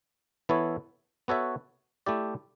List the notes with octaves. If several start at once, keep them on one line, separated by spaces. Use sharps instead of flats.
E3 B3 E4 A4 C#5
B3 F#4 A4 C#5 E5
A3 E4 G4 D5